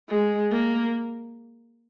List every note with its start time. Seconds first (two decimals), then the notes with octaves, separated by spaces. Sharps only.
0.09 G#3
0.51 A#3